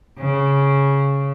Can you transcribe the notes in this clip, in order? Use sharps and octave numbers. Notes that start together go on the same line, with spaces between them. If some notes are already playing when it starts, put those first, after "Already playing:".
C#3